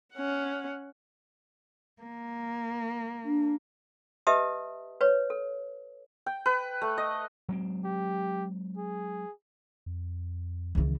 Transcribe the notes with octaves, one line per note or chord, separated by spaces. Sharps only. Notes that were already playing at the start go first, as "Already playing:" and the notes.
C#4 F#5
A#3
D4
G4 B4 D#5 E5 A5 D#6
B4 C#5
A4
G5
B4
A3
D#5
F#3 G#3 C4
G4
G#4
F2
C#2 D#3 E3